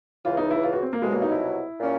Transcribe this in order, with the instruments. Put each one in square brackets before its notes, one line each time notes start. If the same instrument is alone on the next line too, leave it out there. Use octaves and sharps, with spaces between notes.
[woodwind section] C#2 C#3 E3 [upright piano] F4
[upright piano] D#4
E4
F4
F#4
C4
A#3
[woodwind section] C2 B2 F#3 [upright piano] G#3
[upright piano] A#3
D#4
E4
[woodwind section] A#2 G3 A#3 C#4